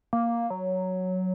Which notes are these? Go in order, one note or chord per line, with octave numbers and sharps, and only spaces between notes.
A#3
F#3